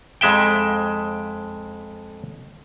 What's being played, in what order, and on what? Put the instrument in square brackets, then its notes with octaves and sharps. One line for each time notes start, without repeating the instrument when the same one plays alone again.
[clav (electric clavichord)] F2 G#3 E5 G5